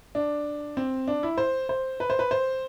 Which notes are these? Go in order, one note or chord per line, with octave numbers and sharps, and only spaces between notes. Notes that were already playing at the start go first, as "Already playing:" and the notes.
D4
C4
D4
E4
C5
C5
B4
C5
B4
C5